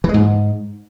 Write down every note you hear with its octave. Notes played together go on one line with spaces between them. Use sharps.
E3
G#3
G#2